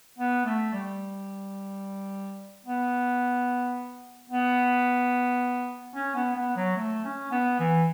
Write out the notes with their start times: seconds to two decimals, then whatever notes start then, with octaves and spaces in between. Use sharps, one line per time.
0.18 B3
0.46 A3
0.73 G3
2.66 B3
4.30 B3
5.95 C#4
6.15 B3
6.36 B3
6.56 F#3
6.77 A3
7.04 C#4
7.32 B3
7.59 E3